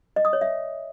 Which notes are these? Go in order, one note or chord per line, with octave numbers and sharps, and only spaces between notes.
D#5
D#6
C#5
E5